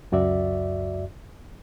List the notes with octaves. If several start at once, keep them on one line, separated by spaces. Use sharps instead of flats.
C#2 F#2 F#4 D5 E5